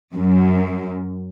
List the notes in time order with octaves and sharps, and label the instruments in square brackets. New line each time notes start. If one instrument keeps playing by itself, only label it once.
[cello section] F#2